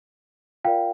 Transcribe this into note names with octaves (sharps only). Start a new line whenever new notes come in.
F4 A#4 D5 F5 G5